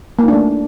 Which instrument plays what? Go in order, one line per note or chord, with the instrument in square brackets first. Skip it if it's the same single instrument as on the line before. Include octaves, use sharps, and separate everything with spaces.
[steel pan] A#3
D#4
D4
A3